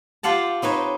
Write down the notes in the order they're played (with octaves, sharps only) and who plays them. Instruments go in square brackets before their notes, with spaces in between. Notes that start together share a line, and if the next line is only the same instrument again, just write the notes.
[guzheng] F4 G4 F5 F#5 A5
C4 D#4 B4 C#5